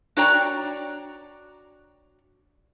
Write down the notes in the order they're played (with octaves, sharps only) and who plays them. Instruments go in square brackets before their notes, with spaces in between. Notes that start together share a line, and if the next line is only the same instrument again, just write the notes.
[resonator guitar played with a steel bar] D4 F#4 C#5 D5 G5 A#5